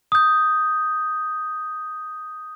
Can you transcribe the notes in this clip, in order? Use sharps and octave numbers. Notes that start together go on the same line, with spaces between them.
D#6 G6